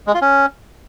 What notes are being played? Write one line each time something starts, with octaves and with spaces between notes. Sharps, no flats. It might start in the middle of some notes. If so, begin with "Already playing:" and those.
G#3
F4
C#4